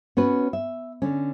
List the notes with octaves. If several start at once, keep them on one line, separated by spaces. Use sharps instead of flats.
B3 C#4 F#4 B4
E5
D3 C#4